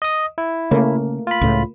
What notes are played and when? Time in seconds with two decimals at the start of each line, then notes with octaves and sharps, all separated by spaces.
0.02 D#5 D#6
0.38 E4
0.71 C#3 A3 A#3
1.27 F4 B5
1.41 C#2 A2